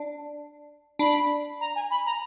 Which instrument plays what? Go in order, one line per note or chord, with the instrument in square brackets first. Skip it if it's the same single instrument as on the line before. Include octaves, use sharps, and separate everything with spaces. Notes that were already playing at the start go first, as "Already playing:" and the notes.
Already playing: [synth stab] D4
[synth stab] D4 [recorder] B5
[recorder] A#5
G#5
B5
A#5